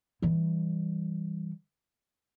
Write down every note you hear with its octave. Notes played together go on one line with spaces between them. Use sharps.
E3 G3